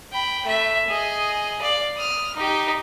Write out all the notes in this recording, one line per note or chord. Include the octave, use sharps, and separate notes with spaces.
G5 B5
A3 E5
G#4 D#5
D5 F5
D#6 F6
D#4 G4